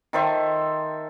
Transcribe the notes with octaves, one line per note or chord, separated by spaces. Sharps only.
D#3 A4 C5 E5